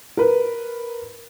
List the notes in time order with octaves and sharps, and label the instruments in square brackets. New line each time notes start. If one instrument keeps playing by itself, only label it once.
[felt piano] A#4 B4